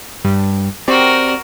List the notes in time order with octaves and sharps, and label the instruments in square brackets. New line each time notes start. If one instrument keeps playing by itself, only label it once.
[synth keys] G2
[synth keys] C4 G4 D5 [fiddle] F#4 A#4